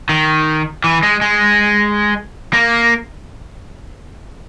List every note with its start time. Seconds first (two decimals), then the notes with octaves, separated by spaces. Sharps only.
0.09 D#3
0.84 E3
1.03 G#3
1.21 G#3
2.53 A#3